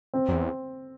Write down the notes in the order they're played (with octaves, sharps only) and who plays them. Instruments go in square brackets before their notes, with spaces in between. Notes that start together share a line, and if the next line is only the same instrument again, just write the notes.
[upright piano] C4
[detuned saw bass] F#2
E2